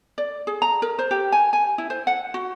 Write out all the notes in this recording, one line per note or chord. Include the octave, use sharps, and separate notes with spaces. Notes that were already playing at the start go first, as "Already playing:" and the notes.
D5
G#4
A#5
A#4
C5
G4
G#5
G#5
E4
C5
F#5
F#4